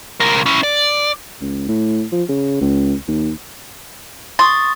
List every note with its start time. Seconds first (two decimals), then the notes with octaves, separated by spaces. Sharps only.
0.20 C#2 A#4
0.46 C#4 E4
0.63 D5
1.41 C#2
1.68 A2
2.12 F3
2.29 C#3
2.61 C#2
3.08 D#2
4.39 C6 C#6 D#6 A6